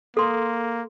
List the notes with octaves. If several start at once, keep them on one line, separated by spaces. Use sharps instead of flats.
A#3 A4 C6